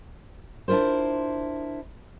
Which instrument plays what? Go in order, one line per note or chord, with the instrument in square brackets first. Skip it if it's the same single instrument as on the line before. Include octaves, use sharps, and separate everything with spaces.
[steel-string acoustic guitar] D4 E4 F4 A#4 C5